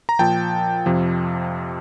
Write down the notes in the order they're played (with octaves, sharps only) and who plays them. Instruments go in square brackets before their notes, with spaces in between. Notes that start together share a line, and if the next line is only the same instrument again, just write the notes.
[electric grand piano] A#5
A#2 F3 G5 A5
F2 C3 F3